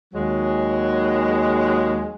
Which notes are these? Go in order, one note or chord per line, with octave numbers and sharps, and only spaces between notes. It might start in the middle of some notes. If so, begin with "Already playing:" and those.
D#2 F#3 G#3